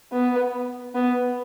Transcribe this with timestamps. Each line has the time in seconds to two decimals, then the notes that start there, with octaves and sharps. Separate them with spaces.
0.12 B3
0.95 B3